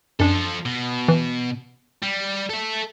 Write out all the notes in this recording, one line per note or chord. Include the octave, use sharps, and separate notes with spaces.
F#2 F3 D4 A4
B2
E3
G3
A4 E5